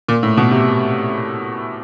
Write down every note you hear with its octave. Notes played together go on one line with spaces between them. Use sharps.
A#2
A2
B2
C3